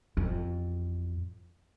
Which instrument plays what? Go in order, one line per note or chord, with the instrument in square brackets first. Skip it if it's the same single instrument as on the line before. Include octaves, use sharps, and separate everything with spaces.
[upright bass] A1 F2